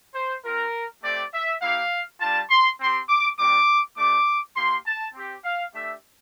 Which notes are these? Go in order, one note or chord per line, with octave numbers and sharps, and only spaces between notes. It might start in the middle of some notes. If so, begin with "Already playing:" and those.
C5
C4 F4 A#4
A3 C4 G4 D5
E5
A#3 E4 G4 F5
G3 D4 F4 A5
C6
C4 G4 C6
D6
G3 A#3 D4 G4 D6
A3 D4 G4 D6
A#3 E4 G4 C6
A5
C4 G4
F5
A3 D4 G4 E5